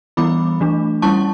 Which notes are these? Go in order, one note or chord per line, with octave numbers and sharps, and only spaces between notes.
E3 G3 B3 E4 B5 D6
E3 A3 D4
G3 C#4 E4 A5 C#6